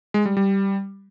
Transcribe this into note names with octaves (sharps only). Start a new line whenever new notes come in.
G#3
G3
G3